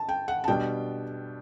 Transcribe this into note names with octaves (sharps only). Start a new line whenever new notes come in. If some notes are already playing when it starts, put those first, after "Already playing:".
Already playing: A5
G5
F#5
A5
B2 G3 D4 G5